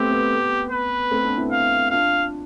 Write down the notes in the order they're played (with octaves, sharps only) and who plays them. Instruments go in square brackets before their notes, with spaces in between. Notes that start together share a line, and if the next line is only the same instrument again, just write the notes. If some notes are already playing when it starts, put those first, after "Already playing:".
Already playing: [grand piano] A3 B3 C4 [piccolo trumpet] G4
[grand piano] B3
[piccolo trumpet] B4
[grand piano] A3 C4
B3 D4
C4 E4
[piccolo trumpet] F5
[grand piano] D4 F4 [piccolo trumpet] F5